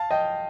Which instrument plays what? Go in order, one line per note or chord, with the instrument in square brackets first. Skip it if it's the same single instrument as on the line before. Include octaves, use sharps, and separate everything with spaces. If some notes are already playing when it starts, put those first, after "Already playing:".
Already playing: [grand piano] F5 A5
D#5 G5